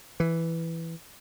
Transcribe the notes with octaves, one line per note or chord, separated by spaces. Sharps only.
E3